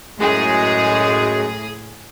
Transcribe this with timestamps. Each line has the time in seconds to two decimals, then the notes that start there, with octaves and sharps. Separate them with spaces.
0.20 F#2 A2 F#3 G#3 G#4